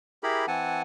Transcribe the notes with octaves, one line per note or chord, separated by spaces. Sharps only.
E4 G4 G#4 A#4 B5
E3 C4 F#5 G#5 A5